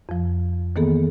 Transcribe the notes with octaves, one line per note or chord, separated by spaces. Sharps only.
F2 F3
D#3 E3 A#3 B3 G#4 A4